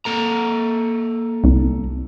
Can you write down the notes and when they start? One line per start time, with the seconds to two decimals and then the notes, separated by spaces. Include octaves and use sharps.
0.05 A#3 A4 A#5
1.44 C2